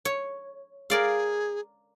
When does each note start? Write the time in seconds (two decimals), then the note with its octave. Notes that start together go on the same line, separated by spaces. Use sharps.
0.05 C#5
0.90 G#4 A#4 D5 F5